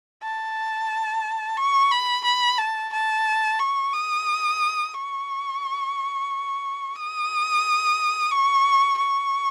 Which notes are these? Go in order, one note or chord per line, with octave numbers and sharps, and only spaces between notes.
A5
C#6
B5
B5
A5
A5
C#6
D#6
C#6
D#6
C#6
C#6